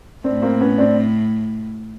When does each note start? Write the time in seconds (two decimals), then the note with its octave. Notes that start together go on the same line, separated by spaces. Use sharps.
0.24 A2 C4 D4
0.42 A#3 C4
0.60 B3 C#4
0.78 C4 D4